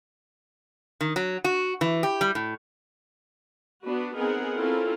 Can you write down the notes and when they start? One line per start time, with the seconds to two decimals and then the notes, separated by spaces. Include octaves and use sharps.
1.01 D#3
1.16 F#3
1.44 F#4
1.81 E3
2.03 G4
2.21 G3
2.35 A2
3.84 B3 D4 F#4 B4
4.15 B3 C4 D#4 G#4 A#4 F#5
4.56 C4 C#4 E4 F4 A4 A#4